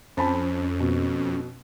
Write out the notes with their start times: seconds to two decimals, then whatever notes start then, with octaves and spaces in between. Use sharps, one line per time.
0.17 F2 C#4 C5 A5 B5
0.80 B2